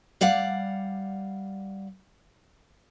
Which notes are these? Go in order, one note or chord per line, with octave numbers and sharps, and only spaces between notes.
G3 D5 F5 F#5